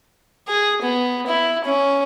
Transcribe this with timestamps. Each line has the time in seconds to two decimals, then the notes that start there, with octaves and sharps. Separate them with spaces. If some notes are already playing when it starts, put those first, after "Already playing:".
0.48 G#4
0.82 B3
1.27 E4
1.65 C#4